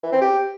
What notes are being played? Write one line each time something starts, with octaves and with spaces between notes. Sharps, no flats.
E3
C4
G4